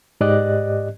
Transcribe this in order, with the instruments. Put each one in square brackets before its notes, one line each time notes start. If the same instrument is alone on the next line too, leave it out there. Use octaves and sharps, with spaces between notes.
[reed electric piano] G#2 G4 D5 D#5 F#6